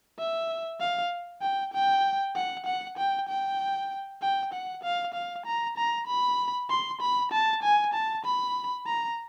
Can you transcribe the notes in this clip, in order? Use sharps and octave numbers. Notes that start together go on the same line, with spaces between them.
E5
F5
G5
G5
F#5
F#5
G5
G5
G5
F#5
F5
F5
A#5
A#5
B5
C6
B5
A5
G#5
A5
B5
A#5